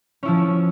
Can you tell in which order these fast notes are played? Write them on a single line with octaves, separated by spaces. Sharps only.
C#4 E4 F3